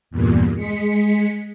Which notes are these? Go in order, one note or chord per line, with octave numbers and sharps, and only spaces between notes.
E2 G2 A#2
G#3 B6 C#7